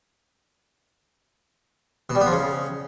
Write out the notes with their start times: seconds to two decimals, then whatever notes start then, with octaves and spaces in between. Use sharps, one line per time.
2.10 B2
2.15 G3
2.21 B3
2.26 F3
2.32 C#3